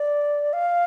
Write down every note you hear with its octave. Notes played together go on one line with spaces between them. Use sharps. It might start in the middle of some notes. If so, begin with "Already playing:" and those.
Already playing: D5
F5